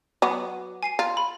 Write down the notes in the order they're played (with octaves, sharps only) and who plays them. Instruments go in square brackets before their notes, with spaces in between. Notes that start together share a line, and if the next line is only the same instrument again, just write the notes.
[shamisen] F#3 B3 [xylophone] D6
[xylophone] G#5 C7 D#7
[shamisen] F4 [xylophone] A#5
[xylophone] B5